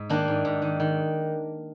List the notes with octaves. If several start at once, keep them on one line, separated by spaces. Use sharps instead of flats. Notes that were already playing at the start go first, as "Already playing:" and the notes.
Already playing: G#2
D#3 A#3 D4
G#2
G#2
D#3
D#3